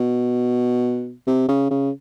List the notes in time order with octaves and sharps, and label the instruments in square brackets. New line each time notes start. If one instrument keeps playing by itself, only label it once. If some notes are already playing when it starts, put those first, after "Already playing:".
Already playing: [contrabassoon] B2
C3
C#3
C#3